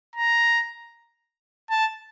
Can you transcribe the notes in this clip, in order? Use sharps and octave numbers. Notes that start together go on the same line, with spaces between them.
A#5
A5